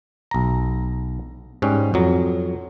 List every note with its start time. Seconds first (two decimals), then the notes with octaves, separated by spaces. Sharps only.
0.31 B1 A#5
1.62 G#2 G3 C#4
1.94 F2 F#3